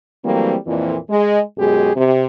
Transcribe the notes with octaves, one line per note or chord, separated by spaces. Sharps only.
E3 F#3 G3 A3 A#3 C4
F2 A#2 E3
G#3
F#2 B2 G#3 G4 G#4
C3